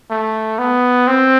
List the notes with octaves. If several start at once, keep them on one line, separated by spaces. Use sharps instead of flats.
A3
B3
C4